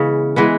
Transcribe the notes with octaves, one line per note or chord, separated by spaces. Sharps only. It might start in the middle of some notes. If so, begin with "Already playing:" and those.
Already playing: C#3 E3 G#3 B3
E3 G#3 B3